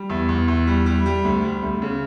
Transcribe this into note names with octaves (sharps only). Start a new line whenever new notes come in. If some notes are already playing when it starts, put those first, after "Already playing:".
Already playing: G3
E2
E2
E2
G3
G3
G3
D2
G3
D2
C#3